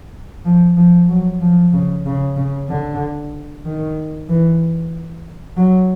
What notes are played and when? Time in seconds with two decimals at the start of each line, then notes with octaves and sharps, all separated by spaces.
0.45 F3
0.77 F3
1.09 F#3
1.41 F3
1.73 C#3
2.06 C#3
2.37 C#3
2.69 D3
3.65 D#3
4.29 E3
5.57 F#3